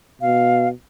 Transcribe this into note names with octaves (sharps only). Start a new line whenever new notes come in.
B2 F5